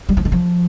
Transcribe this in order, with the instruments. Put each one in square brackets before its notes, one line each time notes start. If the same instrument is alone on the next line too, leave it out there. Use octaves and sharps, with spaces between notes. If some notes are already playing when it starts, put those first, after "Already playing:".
[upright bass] G3
F3
D#3
F3